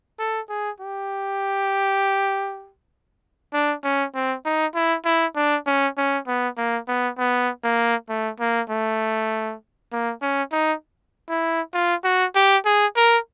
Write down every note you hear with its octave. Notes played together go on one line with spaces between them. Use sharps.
A4
G#4
G4
D4
C#4
C4
D#4
E4
E4
D4
C#4
C#4
B3
A#3
B3
B3
A#3
A3
A#3
A3
A#3
C#4
D#4
E4
F4
F#4
G4
G#4
A#4